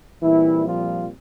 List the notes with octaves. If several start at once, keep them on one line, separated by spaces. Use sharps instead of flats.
A#2 E3 G3 C4 E4
F3 F4